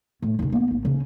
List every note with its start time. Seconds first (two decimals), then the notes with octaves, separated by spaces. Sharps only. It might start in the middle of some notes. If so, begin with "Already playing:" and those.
0.22 A2
0.39 D#2 C#3
0.52 A#3 B3
0.70 G#1
0.85 C#3 C#4